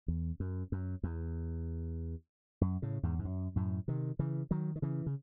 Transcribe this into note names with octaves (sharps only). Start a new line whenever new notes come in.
E2
F#2
F#2
E2
F#2
A2 C#3
E2 G#2
G#2
F#2
F#2 A2
C3 D#3
C#3 E3
D#3 F#3
D#3
C#3 E3
C#3